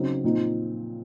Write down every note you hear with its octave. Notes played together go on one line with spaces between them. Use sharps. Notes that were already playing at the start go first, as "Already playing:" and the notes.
Already playing: C#3 F#3 C4 D#4
A#2 F3 C4 D#4